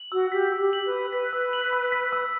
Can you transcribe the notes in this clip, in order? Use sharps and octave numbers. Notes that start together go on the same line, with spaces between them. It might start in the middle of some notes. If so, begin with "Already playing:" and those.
Already playing: F#7
F#4 E6
G4 B6
E6
G4
F#7
B4
E6
B4 B6
E6
F#7
E6
B6
E6